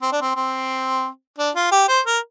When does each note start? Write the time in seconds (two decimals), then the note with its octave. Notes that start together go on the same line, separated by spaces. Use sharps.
0.02 C4
0.12 D4
0.21 C4
0.36 C4
1.38 D4
1.56 F4
1.72 G4
1.88 C5
2.06 A#4